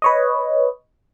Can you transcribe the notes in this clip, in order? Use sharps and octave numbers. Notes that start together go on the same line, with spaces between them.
B4 C#5 D#5